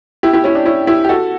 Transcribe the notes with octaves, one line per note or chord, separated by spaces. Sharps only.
E4 G4
E4 G4
C#4 E4
D4
C#4 E4
E4 G4
G4
F#4 A4